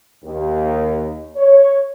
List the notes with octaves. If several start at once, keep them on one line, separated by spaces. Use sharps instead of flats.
D#2
C#5